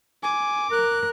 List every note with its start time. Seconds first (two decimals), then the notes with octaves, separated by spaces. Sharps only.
0.23 G#5 D6
0.72 A#4 F#6